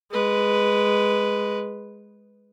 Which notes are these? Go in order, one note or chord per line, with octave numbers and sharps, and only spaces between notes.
G#3 B4